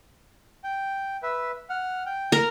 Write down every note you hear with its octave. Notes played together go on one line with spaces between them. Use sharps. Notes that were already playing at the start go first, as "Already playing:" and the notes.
G5
B4 E5
F#5 F6
G5
A#4